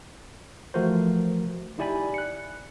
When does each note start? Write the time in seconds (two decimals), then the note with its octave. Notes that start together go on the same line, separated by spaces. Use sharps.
0.74 E3 F3 A3 F#4 A#4 C5
1.78 D#4 E4 G4 D5 G#5 B5
2.14 F#6 C#7